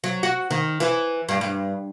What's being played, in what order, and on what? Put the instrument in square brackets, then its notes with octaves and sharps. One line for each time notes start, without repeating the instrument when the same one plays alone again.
[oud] F#3
F#4
D#3
E3
G2
G2